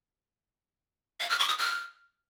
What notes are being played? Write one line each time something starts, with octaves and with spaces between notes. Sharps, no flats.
F5
F6
C#6
D#6
F6